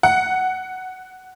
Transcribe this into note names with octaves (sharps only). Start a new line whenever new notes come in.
F#5